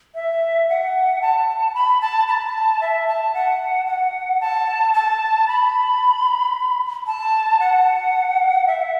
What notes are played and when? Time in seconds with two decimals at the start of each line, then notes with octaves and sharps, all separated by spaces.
0.15 E5
0.69 F#5
1.22 A5
1.75 B5
2.01 A5
2.28 B5
2.31 A5
2.81 E5
3.07 A5
3.34 F#5
3.87 F#5
4.41 A5
4.94 A5
5.47 B5
7.07 A5
7.60 F#5
8.67 E5